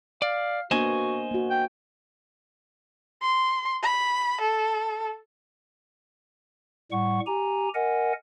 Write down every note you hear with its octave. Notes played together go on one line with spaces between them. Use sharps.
D5 F5
A#3 B3 D4 F#4 C5 D#5 G#5
A#3 F#4
G5
C6
B5
A4
A2 G3 F#5 C#6
G4 G#5 A#5
A#4 D#5 F#5 G#5